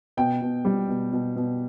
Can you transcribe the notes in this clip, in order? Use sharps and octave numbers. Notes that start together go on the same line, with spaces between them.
B2 G5
B2
G3
B2
B2
B2